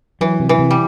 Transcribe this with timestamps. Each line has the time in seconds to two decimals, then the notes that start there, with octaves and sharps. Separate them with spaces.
0.21 E3 F#3
0.40 C3
0.49 E3
0.59 C3
0.71 G3